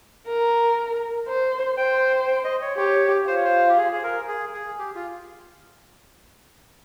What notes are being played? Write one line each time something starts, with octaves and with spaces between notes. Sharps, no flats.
A#4
C5
C5 G5
G5
D#5
C#5
G4 C#5
F4 C5
C#5
C5
G4
G#4
G#4
A#4
G#4
G#4
G4
F4